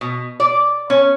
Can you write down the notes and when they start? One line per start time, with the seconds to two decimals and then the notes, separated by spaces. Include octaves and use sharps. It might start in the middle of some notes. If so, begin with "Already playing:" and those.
0.01 B2
0.40 D5
0.90 C#4